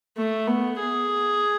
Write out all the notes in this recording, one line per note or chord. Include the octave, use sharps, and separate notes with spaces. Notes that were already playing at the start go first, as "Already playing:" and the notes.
A3
B3
G#4